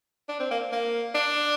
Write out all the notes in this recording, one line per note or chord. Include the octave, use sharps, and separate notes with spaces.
D4
C4
A#3
A#3
D4